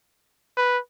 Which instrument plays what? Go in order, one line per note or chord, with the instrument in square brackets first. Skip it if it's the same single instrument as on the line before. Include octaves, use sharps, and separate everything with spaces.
[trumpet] B4